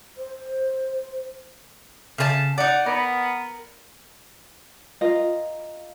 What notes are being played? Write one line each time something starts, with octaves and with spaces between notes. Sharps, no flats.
C5
C#3 B4 A5
D#4 D5 F#5
B3 A#4
F4 A#4 D#5 F5